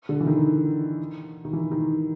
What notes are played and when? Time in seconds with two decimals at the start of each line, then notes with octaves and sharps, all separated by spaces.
0.09 D3
0.20 E3
0.27 D#3
1.45 D#3
1.53 E3
1.71 D#3